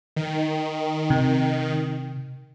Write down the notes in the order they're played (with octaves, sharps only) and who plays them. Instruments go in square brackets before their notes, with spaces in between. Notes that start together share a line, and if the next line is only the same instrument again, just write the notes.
[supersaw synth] D#3
[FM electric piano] C3